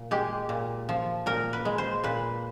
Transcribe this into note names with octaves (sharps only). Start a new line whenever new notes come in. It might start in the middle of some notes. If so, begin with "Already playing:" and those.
Already playing: A#2
G#3 G4
A#2
F3
A#2 A#4
B4
G#3
C5
A#2 B4